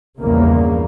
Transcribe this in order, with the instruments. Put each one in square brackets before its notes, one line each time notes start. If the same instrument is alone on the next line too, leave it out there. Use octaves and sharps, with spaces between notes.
[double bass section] A#1 E2 G2 A#2 C#3 A#3